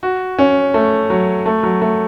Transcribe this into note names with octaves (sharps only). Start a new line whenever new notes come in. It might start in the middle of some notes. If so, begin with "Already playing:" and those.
F#4
C#4
A3
F#3
A3
F#3
A3